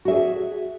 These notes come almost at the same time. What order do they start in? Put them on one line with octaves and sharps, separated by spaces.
F#4 E5 G#4